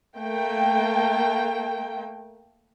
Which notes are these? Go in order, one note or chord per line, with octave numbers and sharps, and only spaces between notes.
A3 A#3 G5